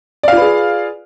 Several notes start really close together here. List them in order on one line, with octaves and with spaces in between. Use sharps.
D5 F5 F4 B4 G#4